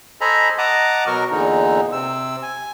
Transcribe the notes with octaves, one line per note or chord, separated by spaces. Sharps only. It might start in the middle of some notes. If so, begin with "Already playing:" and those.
A4 C5 D#5 G#5 A#5 B5
D#5 F#5 A5 A#5 D6 D#6
B2 F#3 F#4 A#4 C#6 F6
E2 A#2 D3 D#4
C3 E6
G#5